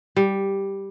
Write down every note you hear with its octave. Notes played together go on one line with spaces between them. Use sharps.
G3